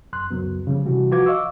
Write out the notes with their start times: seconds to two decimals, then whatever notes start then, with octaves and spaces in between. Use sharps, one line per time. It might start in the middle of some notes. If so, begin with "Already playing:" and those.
0.13 F#2 C6 F#6
0.30 C#2 F#2 F#3 B3
0.67 C#3 F3 G3
0.86 C3 E3 G3 F#4
1.11 F3 F4 F#4 B4 D6 G#6
1.26 D#5 F5 C#6 D6 E6